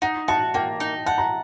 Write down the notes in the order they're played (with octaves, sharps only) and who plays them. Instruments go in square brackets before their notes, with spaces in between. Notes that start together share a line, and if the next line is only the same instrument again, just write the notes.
[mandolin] D#4 [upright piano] F#5
[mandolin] F#4 [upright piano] A5
[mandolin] A#3 [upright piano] G5
[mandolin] D#4
[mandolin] F#5 [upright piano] A5
[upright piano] A#5